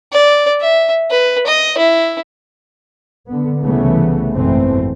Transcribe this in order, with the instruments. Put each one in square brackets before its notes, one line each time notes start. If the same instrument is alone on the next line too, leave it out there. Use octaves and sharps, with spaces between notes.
[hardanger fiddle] D5
E5
B4
D#5
E4
[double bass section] D3 B3
C2 C#3 E3 A3 B3
G#1 F#2 B2 E3 A3 C4